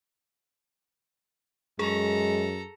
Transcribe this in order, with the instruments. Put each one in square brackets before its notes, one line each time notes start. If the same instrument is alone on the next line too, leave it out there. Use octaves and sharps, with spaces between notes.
[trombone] F#2 [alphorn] G#3 [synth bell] G#4 [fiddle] A4 A#5